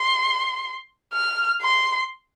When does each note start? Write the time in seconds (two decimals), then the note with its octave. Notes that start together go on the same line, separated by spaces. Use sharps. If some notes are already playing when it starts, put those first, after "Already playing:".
Already playing: C6
1.13 F6
1.62 C6